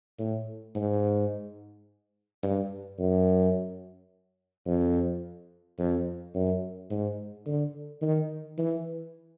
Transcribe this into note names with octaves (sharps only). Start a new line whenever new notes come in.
A2
G#2
G2
F#2
F2
F2
F#2
G#2
D3
D#3
E3